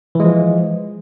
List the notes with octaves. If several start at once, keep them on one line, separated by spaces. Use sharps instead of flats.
E3 F3 G#3